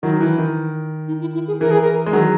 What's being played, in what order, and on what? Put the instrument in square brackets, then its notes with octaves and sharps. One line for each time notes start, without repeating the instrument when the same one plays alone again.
[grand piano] D#3 F#3 [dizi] E4
[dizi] D#4
[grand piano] E3 [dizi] E4
[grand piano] D#3
[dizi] D#4
E4
E4
G#4
[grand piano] E3 [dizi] A#4
[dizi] G#4
A#4
[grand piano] G#3
[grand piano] D#3 F#3 [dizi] G#4